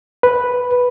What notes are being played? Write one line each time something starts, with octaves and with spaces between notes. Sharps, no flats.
B4